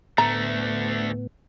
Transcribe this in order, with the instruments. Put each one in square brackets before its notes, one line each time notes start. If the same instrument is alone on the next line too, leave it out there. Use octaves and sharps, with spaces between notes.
[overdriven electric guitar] D2 A3 [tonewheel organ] A2 B3 [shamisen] A#5